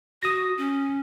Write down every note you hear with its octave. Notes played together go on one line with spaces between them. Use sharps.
F#4 D#6 A#6
C#4